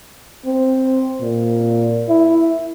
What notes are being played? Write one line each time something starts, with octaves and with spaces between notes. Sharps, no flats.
C4
A#2
E4